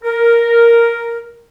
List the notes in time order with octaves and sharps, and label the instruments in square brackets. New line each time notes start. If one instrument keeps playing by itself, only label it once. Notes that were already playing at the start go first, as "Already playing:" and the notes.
[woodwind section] A#4